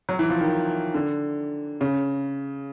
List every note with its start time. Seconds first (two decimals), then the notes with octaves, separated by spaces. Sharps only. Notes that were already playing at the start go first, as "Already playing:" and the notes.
0.09 F#3
0.19 E3
0.30 F3
0.41 D#3
0.94 D3
1.81 C#3